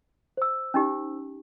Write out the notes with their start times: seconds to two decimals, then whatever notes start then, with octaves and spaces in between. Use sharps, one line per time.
0.37 C5 E6
0.74 C#4 D#4 G4